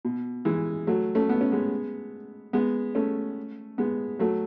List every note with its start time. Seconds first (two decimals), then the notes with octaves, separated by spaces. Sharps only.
0.05 B2
0.45 E3 G#3
0.87 F#3 A3
1.15 A3 C#4
1.29 B3
1.41 C#4
1.52 G#3 B3
2.53 G#3 B3
2.95 A3 C#4
3.78 G#3 B3
4.19 F#3 A3